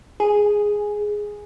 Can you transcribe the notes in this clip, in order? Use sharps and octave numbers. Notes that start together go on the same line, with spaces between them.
G#4